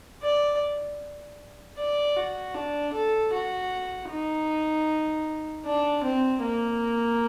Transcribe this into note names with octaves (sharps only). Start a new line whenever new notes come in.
D5
D5
F#4
D4
A4
F#4
D#4
D4
C4
A#3